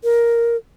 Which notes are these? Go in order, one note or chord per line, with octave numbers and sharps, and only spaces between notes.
A#4